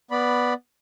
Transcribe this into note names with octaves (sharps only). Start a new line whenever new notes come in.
B3 D5 B5